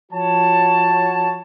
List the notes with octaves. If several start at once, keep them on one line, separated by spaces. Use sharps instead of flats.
F3 F#4 C#5 A5